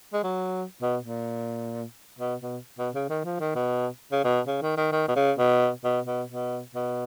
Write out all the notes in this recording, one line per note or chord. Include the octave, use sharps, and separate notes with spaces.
G#3
F#3
B2
A#2
B2
B2
B2
C#3
D#3
F3
D#3
B2
C#3
B2
C#3
D#3
D#3
D#3
B2
C#3
B2
B2
B2
B2
B2